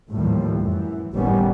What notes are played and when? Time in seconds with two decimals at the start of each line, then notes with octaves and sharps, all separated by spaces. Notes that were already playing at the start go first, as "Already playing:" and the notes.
0.12 D#2 A2 E3 F3 G3
0.57 F#2 E3
1.13 F#1 A2 D#3 G3 B3 C#4